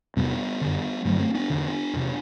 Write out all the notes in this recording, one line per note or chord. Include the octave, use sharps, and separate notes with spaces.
E2 C3 G3 B3
F#2 D3
G2 D3 F#3 A3
A3 C4
B3 D4
E2 D3
E2 C3